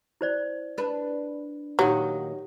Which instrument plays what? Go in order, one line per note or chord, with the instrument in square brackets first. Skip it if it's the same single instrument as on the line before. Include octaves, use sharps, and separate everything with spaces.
[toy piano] E4 C5 D5
[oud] D4 B4
[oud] A#2 D#3 [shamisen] F#3 [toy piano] G4